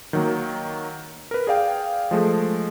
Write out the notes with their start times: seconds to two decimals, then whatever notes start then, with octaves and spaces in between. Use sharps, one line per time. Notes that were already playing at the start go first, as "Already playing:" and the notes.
0.13 D#3 F#3 A#3
1.31 A#4 B4
1.47 G#4 D5 F5 G5
2.11 F3 G#3 A3